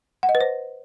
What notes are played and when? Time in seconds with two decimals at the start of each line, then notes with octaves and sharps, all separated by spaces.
0.23 F#5
0.29 D#5
0.35 B4
0.41 C5